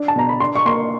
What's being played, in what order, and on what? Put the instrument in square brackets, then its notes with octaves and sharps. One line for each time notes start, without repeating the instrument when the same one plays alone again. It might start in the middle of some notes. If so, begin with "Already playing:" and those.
Already playing: [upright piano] D4
A5
B2 A#5
B5
D4 C6
C#6
A#3 C6